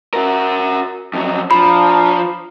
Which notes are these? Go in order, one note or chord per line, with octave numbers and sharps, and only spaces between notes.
F#4 A#4
F2 F#3
F3 D4 F5 A#5 B5